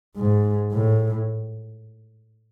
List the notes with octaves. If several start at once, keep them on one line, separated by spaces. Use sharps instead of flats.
G#2
A2